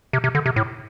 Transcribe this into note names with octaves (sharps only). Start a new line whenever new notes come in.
C3
C3
D3
C3
A2